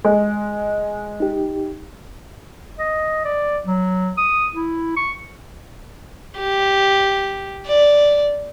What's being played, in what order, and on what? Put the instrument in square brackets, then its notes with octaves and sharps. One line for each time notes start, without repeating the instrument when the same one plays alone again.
[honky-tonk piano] G#3
[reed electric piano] D#4 G4
[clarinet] D#5
D5
F#3
D#6
E4
C#6
[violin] G4
D5